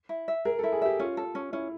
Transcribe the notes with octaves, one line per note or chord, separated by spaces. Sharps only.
E4
E5
G#4 A#4
E4 A4
G#4
G4 E5
C#4 F4
A4
C#4
C#4 E4